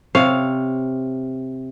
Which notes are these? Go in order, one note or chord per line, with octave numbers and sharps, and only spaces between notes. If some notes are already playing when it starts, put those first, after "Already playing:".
C3 C#5 F5